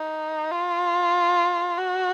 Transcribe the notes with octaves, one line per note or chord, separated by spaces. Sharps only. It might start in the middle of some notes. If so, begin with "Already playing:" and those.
Already playing: D#4
F4
F#4